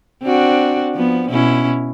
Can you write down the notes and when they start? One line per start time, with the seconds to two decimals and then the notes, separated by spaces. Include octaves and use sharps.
0.23 C4 D4 F#4
0.94 F3 B3
1.30 B2 C#4 E4